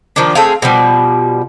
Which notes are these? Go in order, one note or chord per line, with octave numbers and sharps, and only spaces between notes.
D#3 F3 A#3 D4
A3 C4 G#4 F5
B2 F3 G3